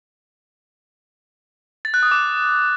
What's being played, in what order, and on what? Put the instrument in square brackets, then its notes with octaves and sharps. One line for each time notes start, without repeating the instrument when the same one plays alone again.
[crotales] A6
F#6
D#6
D6